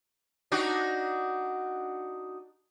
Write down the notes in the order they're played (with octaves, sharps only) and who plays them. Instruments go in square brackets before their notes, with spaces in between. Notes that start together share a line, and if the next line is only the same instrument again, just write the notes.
[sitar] D4 D#4 F#4